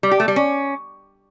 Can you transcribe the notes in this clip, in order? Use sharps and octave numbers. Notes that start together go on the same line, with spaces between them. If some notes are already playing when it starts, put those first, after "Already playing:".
G3
G4
A3
G3
C#4